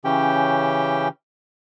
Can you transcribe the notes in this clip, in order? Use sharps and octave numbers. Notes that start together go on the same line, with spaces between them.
C#3 E3 C#4 G4 G5